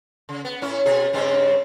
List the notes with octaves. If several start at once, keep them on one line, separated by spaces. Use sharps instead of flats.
C#3
B3
A2 C#4 E4
B2 G#4
G2 C#3 C4